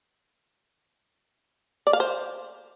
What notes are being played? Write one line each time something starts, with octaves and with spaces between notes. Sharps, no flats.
D5
F5
C5